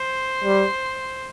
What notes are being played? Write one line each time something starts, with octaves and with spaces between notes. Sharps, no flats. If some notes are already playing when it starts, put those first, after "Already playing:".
Already playing: C5
G3